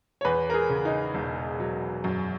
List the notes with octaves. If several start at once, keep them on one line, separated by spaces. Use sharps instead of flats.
C#5
E2 B4
A#4
G#4
C#3
D#4
E1
F#3
F#2